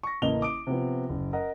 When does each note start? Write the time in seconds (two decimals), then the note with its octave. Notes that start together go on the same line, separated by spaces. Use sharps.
0.03 C#6 A#6
0.22 A1 C#3 A#3 D#5 F7 G7
0.42 D6 D#6 D7
0.67 C3 F3 B3
1.09 F#1
1.33 A#4 D#5 F#5